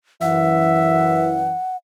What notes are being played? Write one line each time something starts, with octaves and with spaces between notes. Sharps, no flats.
F#2 E3 E5 F#5